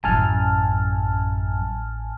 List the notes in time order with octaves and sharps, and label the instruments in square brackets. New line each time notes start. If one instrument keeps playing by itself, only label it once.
[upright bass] A1 F#3 [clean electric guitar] F#2 [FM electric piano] G#5 A5 F6